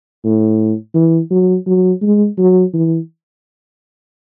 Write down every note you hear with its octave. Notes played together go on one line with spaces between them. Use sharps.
A2
E3
F#3
F#3
G#3
F#3
E3